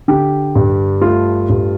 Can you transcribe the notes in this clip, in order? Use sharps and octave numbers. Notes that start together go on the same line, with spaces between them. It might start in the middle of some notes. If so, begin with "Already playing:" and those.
D3 G4
G2
A3 F4
G2